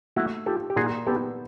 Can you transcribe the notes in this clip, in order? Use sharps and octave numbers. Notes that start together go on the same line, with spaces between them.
A3 E4 F#4
F4 G4 A4
G4
A#2 F#4 G#4
B3 G4 A4